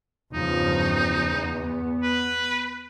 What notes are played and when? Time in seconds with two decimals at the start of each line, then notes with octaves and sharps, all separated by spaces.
0.34 E2 G2 C#3 F3 D#4
1.28 B3
2.03 B4